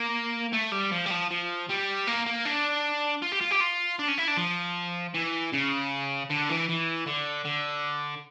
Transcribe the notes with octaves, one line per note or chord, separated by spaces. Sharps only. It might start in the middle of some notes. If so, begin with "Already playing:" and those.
Already playing: A#3
A3
G3
F3
G3
F3
F3
G3
A#3
A#3
D4
F4
G4
F4
G4
F4
D4
C#4
E4
D4
F3
E3
C#3
D3
E3
E3
D3
D3